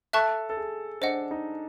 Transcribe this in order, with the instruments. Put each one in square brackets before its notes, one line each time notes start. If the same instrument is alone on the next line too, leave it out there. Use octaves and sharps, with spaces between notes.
[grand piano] A4 [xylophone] E5 A5 C#6 F#6
[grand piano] A4
G#4
[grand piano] D4 [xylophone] C5 D#5 F#5
[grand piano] D#4